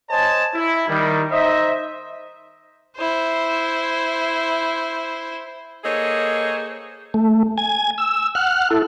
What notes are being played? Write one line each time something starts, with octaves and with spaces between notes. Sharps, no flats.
C5 C#5 D#5 G#5 A5
E4
D#3 G3
D#4 C5 D#5 E5
E4 C5
A#3 G#4 A4 C5 C#5 D#5
A3
G#5 G#6
E6
F#5 F6 F#6
E4 A4